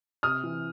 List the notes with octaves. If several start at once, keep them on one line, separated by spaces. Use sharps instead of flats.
C3 D#6 F6
E3